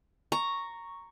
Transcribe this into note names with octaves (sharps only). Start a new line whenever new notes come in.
A#5 C#6